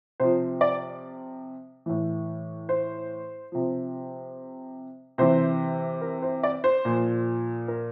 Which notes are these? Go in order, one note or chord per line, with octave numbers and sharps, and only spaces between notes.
C3 F3 C5
D5
A2 E3
C5
C3 F3
C3 E3 C5
A#4
C5
D5
C5
A#2 F3
A#4